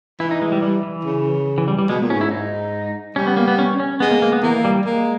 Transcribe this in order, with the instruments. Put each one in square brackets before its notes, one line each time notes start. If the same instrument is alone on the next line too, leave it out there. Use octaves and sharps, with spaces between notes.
[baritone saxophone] E3 [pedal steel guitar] E4
[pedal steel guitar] D#4
G#3
G3
G3
E3
[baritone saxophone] C#3
[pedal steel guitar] E3
G3
G3
[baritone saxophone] B2 [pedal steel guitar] G#3
[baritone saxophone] A#2
[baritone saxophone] G#2 [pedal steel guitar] C#4
[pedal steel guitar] E4
[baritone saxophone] G#2 [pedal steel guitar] D#4
[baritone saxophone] G3 [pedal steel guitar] C#4
[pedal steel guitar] B3
A#3
B3
C#4
C#4
[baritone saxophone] G#3 [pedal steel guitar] B3
[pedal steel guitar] A#3
A#3
B3
[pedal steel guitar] E3 [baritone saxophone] A#3
[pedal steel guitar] G3
[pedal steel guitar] G#3 [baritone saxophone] A#3